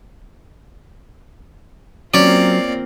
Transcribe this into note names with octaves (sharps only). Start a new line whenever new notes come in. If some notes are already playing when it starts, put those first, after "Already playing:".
F#3 A#3 C4 C#4 F4 C#5 D5